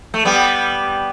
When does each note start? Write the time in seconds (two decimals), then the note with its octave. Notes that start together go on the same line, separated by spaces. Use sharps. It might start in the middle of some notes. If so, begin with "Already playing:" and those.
0.14 A3
0.25 G3 B3